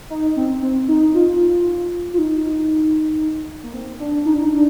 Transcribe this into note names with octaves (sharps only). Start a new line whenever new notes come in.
D#4
C4
C4
D#4
F4
F4
D#4
A#3
C4
D4
D#4
D4
D#4
D4